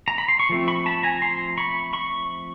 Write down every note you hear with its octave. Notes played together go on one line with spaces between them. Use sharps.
A#5
B5
C6
C#6
F3 A3 C4
B5 C#6
A5 B5
G#5 A#5
A#5 C6
B5 C#6
B5 C#6